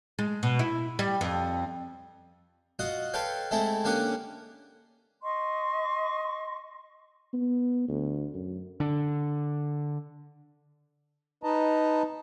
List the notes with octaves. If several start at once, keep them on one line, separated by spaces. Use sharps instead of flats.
G#3
B2
E4
G3
F2
F4 F#4 D#5 F#5
A4 B4 C#5 F5 G5
G#3 A3 C4 E4 A4
D3 A#3 C#4 G4 F#5 D#6
D#5 C6 C#6
B3
D2
F#2
D3
D#4 B4 D#5 A5 A#5